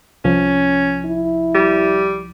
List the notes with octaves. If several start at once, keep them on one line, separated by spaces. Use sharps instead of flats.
C2 F3 C#4
E4
G3